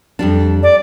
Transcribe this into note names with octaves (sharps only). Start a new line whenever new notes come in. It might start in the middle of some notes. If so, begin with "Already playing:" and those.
F2 G3 D4
D5